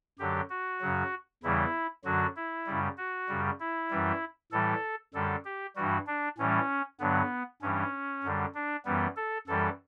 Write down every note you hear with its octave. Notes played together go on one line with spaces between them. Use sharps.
F#2 D3 F#3 G4
F#4
F#2 C#3 F#3
E2 C#3 E3 G3 E4
F#2 D3 F#3 F#4
E4
F#2 C#3 G3
F#4
F#2 C#3 G3
E4
F#2 E3 G3
A2 E3 G3 A4
F#2 D3 G3 A4
G4
G2 E3 G3 F#4
D4
A2 E3 G3 C#4
G2 D3 F#3 B3
G2 E3 G3 C#4
F#2 D3 G3
D4
F#2 E3 G3 B3
A4
F#2 E3 G3 A4